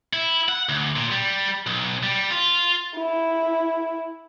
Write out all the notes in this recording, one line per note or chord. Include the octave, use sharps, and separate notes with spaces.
E4
F#5
D2
A#2
G3
B1
G3
F4
E4